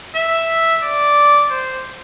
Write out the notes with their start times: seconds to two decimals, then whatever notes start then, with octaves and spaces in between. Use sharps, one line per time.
0.16 E5
0.83 D5
1.51 C5